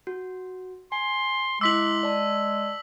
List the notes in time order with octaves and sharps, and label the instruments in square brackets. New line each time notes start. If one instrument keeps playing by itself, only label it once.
[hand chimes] F#4
[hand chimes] G#5 [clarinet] C6
[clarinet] G#3 [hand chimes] E4 C6 D6 [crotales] E6 B6 F#7
[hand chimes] D5 A5